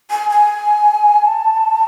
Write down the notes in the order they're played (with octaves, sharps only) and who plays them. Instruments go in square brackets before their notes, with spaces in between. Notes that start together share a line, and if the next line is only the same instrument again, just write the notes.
[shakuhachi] G#5
G#5
A5